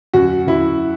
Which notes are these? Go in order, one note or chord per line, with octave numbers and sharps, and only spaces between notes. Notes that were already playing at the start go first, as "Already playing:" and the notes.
F#2 F#4
F#2 E4